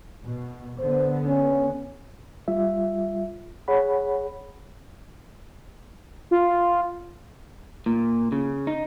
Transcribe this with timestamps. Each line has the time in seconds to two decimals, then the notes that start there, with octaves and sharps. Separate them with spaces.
0.24 B2
0.79 D3 B3 C5
1.26 C#4
2.48 G3 F4 E5
3.68 G#4 C#5 F#5 B5
6.31 F4
7.86 A#2
8.32 C#3
8.67 D#4